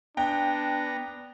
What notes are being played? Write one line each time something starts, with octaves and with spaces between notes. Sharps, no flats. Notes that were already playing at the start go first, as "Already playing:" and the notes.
B3 D4 G5 A#5